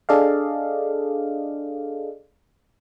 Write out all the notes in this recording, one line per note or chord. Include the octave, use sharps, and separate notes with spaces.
D4 G#4 A4 D5 D#5 F5